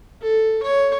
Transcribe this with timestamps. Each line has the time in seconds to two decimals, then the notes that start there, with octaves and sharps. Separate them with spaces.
0.22 A4
0.63 C#5